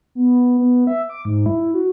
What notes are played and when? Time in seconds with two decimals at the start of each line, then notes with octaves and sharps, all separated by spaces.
0.15 B3
0.58 B3
0.87 E5
1.09 D6
1.25 G#2
1.46 E4
1.74 F#4